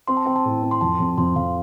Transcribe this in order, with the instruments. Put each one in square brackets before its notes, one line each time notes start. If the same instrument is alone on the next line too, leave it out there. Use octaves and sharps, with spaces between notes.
[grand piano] C4 [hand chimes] C6
[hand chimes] A5
[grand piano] C4 [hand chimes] G5
[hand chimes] A5
[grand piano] A2
C4
[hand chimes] C6
[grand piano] F2 [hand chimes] A5
[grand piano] F2
[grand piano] F2 [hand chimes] C6
[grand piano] F2 [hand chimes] F5